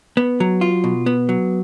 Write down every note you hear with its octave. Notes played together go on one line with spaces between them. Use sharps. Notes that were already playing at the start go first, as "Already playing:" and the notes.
B3
F#3
F4
B2
B3
F#3